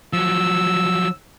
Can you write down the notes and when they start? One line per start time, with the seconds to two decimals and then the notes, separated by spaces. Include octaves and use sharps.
0.13 F3 F#3 E6